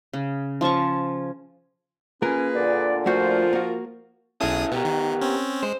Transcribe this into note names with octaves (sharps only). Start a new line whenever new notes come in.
C#3
F3 C#4 A5 C#6
A#3 C#4 F4 G#4 A#4 B4
A#2 D3 D5
F3 A3 F4 F#4 A#4 C5
A#3 F#4
B1 C#4 E4 G#4 A4 D#6
B2 B3 G4 A#4
D#3
C4 C#4
G#3 C5